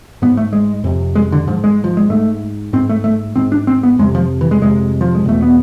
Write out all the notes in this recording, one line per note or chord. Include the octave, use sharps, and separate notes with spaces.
G#2 B3
A3
G#3
F2 C3
G#3
D3
G#2 F3
G#3
F3
G#3
G#2 A3
G#2 C4
A3
A3
G#2 C4
D4
C4
B3
F2 C3 G#3
F3
E3
G#3
F2 C3 G#3
F3
G#3
E2 B2 A3
B3